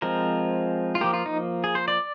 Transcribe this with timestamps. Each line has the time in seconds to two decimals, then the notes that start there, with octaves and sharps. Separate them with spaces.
0.02 F3 G#3 C4 A#4
0.95 F4
1.01 F3 A#3 G4
1.14 F4
1.26 D#4
1.64 G#4
1.75 C5
1.88 D5